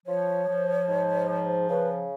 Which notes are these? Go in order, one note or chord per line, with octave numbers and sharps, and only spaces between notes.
F3 C#5
F3
G#2
F3
C#3 B4